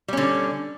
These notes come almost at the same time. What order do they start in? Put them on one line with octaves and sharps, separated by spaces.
G3 C#4 D3